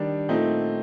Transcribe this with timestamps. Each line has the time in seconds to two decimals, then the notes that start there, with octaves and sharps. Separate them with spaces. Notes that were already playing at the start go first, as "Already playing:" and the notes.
Already playing: D#3 G3 D4
0.29 A#2 A3 C4 D#4